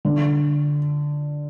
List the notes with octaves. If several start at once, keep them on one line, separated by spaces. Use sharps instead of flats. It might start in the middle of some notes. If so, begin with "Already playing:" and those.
D3